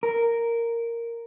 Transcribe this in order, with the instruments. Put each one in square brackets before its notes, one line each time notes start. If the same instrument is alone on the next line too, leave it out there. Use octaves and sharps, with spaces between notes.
[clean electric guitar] A#4